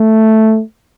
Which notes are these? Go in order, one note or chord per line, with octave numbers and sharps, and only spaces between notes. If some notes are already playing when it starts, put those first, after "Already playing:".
Already playing: A3